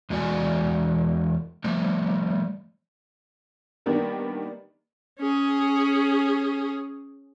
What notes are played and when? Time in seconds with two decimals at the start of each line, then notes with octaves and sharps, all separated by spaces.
0.10 E2 G#3 F#4 D5 G#5
1.64 F3 G3 A3
3.86 D#3 G3 A#3 B3 D4 A#4
5.19 C#4 G#4